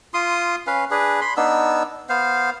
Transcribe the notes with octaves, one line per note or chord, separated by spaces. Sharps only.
F4 C6 D#6
C#4 B4 F5
D4 G#4 B4
B5 C6
B3 D4 D#4 E6
B3 C5 F5